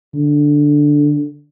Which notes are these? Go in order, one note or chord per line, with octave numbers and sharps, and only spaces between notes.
D3